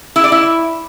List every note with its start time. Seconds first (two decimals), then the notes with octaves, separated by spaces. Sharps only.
0.16 E4
0.24 D5
0.32 E4